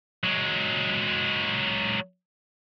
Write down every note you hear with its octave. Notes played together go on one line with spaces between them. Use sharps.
F#3 G#3